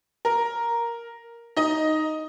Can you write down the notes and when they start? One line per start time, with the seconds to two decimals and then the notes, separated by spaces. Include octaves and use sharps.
0.25 A#4
1.57 D#4 D#5